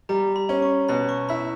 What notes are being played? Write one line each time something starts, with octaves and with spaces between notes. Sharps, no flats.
G3 A#5
B5
C#4
C#6
B2 B5
C#6
E4 B5